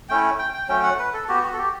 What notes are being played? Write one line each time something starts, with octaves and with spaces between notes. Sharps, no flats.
A3 C#4 E4 G5
G5
G5
F#3 A3 C#4 G5
F#5
B4
A4
B3 F#4 G4
F#4
A4
G4